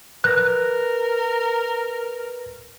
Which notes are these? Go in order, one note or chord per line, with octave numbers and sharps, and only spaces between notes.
A#4 B4 F#6 A#6